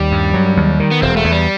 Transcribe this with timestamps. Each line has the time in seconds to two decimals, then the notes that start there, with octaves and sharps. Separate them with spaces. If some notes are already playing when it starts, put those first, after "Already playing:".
Already playing: D#2 G3
0.12 G2
0.34 F#3
0.57 D#2
0.80 D#3
0.91 B3
1.02 E1 C4
1.17 A3
1.24 E2
1.32 G3